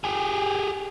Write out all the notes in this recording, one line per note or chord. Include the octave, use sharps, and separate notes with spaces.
G4 G#4